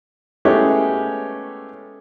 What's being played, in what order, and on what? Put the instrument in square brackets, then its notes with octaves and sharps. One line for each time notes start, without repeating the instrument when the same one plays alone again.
[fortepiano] G#3 A3 B3 C#4 E4 G4